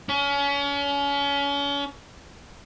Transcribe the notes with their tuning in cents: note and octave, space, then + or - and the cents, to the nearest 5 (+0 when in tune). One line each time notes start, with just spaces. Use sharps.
C#4 +35